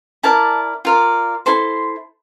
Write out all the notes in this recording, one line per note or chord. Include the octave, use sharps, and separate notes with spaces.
E4 A#4 D5 A5
F4 A#4 D5
E4 A4 C5 C6